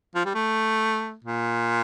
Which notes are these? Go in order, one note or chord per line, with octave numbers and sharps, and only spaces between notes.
F3
G3
A3
A#2